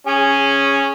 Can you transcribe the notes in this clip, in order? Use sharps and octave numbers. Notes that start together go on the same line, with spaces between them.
C#4 G#4